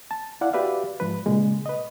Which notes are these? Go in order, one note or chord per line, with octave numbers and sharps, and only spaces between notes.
A5
E4 D5 F5 F#5
F#4 G4 B4 D5 E5 F5
G#2 F3 B4
A#2 C#3 G#3
B4 D#5